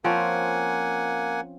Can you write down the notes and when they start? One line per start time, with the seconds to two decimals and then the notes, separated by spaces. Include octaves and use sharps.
0.04 F3 A#3 C4 C#4 F#5 G#5